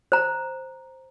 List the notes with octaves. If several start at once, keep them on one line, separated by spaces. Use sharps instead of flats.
C5 A#5